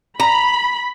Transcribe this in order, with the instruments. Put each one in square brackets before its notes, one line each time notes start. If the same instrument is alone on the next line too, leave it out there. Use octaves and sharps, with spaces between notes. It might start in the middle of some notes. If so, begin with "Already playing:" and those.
[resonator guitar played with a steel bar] A#5 [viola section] B5